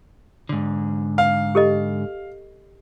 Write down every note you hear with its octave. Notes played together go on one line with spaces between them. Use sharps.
G#2 D3
F5
G4 A4 D#5